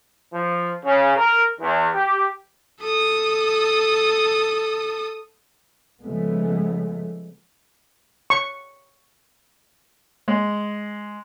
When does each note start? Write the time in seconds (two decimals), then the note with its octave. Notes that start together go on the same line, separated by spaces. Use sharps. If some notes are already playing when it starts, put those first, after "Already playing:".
0.33 F3
0.85 C#3
1.16 A#4
1.60 E2
1.94 G4
2.81 A4 D#6
6.02 C#3 F3 G#3 A3 B3
8.30 C#6
10.28 G#3